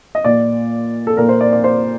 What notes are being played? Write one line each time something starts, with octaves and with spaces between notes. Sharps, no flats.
D#5
A#2 D5
A4
A#2 A#4
C5
D5
D5
C5